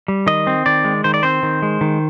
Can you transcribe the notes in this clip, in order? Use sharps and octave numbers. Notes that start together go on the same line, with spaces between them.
G3
D#3 D#5
C4
D#3 D5
G#3
D#3 C5
D5
C4 C5
D#3
G#3
D#3